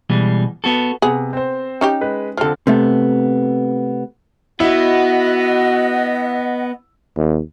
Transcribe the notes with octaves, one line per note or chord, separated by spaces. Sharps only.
B2 E3 G3 G#3
B3 F#4 A4
C3 B3 G#4
C4 C5
C#4 D#4 G4
G#3 B4
D3 F3 C4 A4 F6
C3 A3 B3
B3 E4 F#4 D#5 F#5
D#2